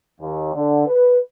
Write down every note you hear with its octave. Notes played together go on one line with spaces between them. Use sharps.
D#2
D3
B4